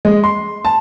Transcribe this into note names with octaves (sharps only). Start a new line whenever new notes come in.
G#3
C6
A5